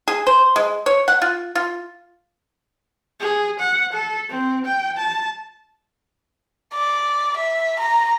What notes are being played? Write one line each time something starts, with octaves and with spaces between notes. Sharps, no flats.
G#4
C5
G#3
C#5
F#5
F4
F4
G#4
F#5
A4
C4
G5
A5
D5
E5
A#5